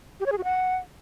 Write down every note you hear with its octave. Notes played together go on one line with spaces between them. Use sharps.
G4
C#5
G#4
F#4
F#5